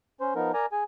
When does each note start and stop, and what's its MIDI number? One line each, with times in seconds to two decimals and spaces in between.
0.21 0.34 61
0.21 0.34 72
0.35 0.52 53
0.35 0.52 59
0.35 0.52 63
0.35 0.52 70
0.54 0.66 70
0.54 0.66 74
0.54 0.66 80
0.54 0.66 82
0.72 0.84 68
0.72 0.84 80